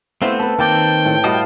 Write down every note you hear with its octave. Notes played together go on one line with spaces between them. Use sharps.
A3 B3 C4 E4 C5 F5
A4 B4 B5
D#3 A#3 C4 G5 A5 D6
A2 A4
G3 F#4 D#5 F5 A5 D#6